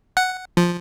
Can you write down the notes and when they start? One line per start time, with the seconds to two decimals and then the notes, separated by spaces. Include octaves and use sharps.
0.17 F#5
0.57 F3